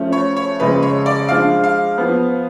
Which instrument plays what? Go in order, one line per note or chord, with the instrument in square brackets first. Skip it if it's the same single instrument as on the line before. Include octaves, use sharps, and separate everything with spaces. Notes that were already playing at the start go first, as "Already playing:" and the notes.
Already playing: [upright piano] F3 A3 C#4
[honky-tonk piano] C#5
C#5
[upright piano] F2 C#3 G#3 [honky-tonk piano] B4
[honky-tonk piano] C#5
D5
[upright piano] F3 G#3 D4 [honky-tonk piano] F5
[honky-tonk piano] F5
[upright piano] F3 B3